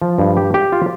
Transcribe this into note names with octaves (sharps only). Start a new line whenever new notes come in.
F3
G2
G4
G4
F4